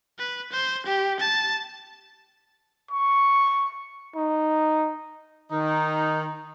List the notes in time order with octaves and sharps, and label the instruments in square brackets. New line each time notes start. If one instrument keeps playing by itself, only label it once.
[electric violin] B4
C5
G4
A5
[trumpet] C#6
D#4
[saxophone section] D#3 [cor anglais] D#4